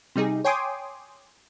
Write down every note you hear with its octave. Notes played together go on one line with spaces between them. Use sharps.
C3 G3 D#4 G#4
C#5 G5 G#5 C6 D6 D#6